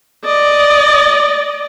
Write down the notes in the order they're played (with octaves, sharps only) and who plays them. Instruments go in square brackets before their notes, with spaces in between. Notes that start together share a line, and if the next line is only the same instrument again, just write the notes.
[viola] D5 D#5